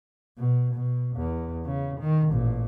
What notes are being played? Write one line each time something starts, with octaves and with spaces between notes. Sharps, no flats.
B2
B2
E2
C#3
D#3
A1 A#2